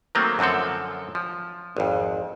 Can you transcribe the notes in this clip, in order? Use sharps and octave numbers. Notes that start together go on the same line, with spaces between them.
D#3 F#3 A3 A#3 C4
F#2 D3 F3 C4 A4
F3
G#1 F2